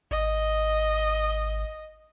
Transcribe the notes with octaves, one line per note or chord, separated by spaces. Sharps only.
G#1 D#5